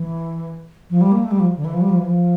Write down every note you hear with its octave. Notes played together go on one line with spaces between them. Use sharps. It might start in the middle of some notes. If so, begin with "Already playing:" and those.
Already playing: E3
F3
G3
A#3
A3
G3
F3
D3
E3
F3
G3
F3
E3
F3